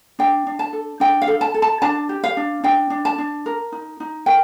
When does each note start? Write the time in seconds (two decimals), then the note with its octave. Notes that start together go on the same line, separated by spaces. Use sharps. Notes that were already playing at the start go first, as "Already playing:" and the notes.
0.19 D4 G5
0.47 D4
0.59 A5
0.73 A4
1.00 D4 G5
1.22 F5
1.27 A4
1.41 A5
1.54 A4
1.62 A5
1.82 D4 A5
2.09 G4
2.24 F5
2.37 D4
2.64 D4 G5
2.90 D4
3.05 A5
3.18 D4
3.46 A#4
3.72 D#4
4.00 D#4
4.26 A#4 G5